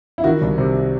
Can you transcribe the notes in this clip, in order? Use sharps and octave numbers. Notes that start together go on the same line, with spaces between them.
E4
D#3 F#4
C2
C3